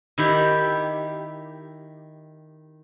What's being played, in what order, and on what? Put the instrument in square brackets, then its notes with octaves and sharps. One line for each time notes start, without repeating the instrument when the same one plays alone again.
[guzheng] D#3 E4 G4